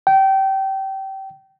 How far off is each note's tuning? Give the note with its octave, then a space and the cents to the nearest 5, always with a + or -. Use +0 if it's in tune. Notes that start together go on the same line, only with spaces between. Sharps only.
G5 -25